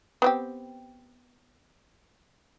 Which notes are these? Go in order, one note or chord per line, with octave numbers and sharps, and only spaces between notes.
B3 C4 G4